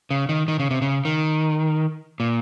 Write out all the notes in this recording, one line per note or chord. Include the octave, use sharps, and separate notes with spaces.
C#3
D#3
D#3
C#3
C3
C#3
D#3
A#2